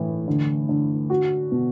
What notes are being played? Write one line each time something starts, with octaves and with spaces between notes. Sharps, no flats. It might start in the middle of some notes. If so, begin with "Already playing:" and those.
Already playing: A2 E3
D3
D3
F#4
B2